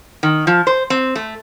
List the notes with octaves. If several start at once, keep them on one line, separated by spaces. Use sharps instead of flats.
D#3
F3
C5
C4
A3